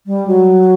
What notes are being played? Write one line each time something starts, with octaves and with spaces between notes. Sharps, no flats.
G3
F#3